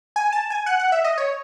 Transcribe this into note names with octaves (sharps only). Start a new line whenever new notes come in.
G#5
A5
G#5
F#5
F#5
E5
D#5
C#5